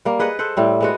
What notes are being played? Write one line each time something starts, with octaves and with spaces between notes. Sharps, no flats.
G3 A#3
G#4 B4 D#5 F#5
A4 C5 F#5
A2 G3 C4
G#3 B3 F#4